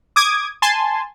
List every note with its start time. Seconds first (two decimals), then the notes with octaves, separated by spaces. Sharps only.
0.16 D6 D#6 G#6
0.62 G#5 A5 C6